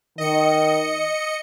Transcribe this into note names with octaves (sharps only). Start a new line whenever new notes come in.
D#3 D#5 C#7